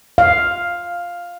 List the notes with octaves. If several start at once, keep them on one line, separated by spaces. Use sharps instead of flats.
F5